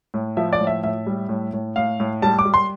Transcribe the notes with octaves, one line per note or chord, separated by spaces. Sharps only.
A2
F3 E5
D5
A2
E5
A2 E5
G3
A2
A2
A2 F5
A2
G3 A5
D6
G3
C6